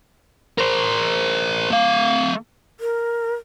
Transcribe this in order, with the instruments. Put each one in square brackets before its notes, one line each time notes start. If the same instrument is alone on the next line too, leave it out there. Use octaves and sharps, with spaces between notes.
[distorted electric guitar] A#4 C5
A3 F5
[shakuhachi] A#4